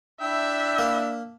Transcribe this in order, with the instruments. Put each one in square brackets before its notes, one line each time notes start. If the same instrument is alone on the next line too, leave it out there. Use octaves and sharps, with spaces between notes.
[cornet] D4 [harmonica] E4 G5 E6 [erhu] E5
[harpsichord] A#3